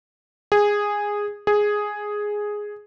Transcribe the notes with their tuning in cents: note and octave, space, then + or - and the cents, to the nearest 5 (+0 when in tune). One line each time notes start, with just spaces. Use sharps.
G#4 -10
G#4 +0